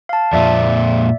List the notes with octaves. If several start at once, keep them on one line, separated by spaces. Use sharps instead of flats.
F5 A5
F2 A#2 D5 E5